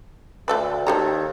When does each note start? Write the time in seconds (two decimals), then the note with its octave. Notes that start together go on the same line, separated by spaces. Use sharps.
0.48 D2 A3 A4 B4
0.87 D#2 G4 A4 A#5